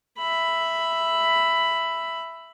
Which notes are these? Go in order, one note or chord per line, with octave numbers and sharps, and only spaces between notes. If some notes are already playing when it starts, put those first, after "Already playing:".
E5 B5